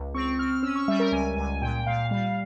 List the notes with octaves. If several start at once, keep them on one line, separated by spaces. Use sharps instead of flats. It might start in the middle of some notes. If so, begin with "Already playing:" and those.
Already playing: C#2
C4 C#6
C4 F6
C#4 E6
C#6
G3 E5
A#4
C#2 G#5
C#2 G#5
A#2 G5
A#2 F5
G3 F5